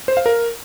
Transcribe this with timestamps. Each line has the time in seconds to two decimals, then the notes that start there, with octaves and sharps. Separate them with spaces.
0.08 C5
0.17 F5
0.26 A#4